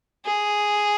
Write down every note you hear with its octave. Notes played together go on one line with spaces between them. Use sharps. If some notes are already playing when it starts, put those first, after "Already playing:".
G#4